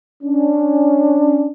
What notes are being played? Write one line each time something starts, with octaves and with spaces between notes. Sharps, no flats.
C#4 D4